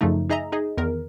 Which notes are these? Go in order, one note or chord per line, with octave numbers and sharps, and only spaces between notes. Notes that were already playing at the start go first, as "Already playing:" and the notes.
F#2 C#3 F3 A3 D#4
D#4 G#4 D#5 E5 A#5
D#4 G#4 D#5
E2 D#3 A#4